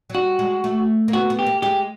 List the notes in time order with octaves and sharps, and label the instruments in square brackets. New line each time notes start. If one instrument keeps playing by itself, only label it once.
[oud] F#3
[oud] G3 [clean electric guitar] F#4
[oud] G#3
A3
A#3
[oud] B3 [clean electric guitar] F#4
[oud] B3
[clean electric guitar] G4
[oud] A#3
[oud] G#3 [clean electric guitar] G4